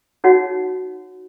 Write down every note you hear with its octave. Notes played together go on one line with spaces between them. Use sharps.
D#4 F#4 C#5 F#5